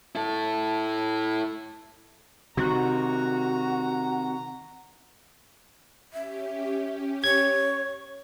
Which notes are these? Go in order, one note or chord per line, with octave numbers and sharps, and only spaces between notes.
E4 A4
C3 D#3 F#4 A#5
C#4 G4 E5
C#5 G#6